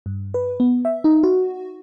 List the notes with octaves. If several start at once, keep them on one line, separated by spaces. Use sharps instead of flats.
G2
B4
B3
E5
D#4
F#4